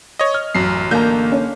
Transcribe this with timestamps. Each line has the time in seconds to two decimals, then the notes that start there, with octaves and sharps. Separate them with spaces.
0.19 C#5 D#5
0.34 F6
0.55 A1 F#2 C7
0.91 D3 A#3 A#5 G6
1.32 C#4